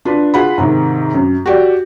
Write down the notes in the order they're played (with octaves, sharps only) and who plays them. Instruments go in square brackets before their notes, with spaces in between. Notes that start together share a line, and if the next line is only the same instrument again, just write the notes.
[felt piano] D4 F4 B4
F4 G#4 F#5 B5
G#2 C3 D#3
F#2
F#4 G4 D5